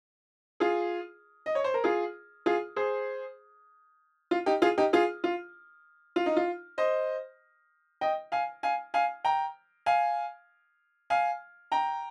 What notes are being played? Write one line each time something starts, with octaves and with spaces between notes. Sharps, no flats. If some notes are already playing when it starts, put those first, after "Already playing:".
F4 G#4
D#5
C#5
C5
A#4
F4 G#4
F4 G#4
G#4 C5
F4
D#4 G4
F4 G#4
D#4 G4
F4 G#4
F4
F4
D#4
F4
C5 D#5
D#5 G5
F5 G#5
F5 G#5
F5 G#5
G5 A#5
F5 G#5
F5 G#5
G5 A#5